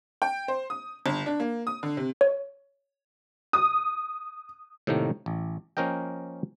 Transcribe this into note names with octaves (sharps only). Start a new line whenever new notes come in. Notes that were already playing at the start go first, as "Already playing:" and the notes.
G5
C5
D#6
G1
D4
A#3
D#6
D3
C3
C#5
D#6
A2 C3 D#3 A3 A#3
A1
F3 A#3 C#4 A#4 D#5 G5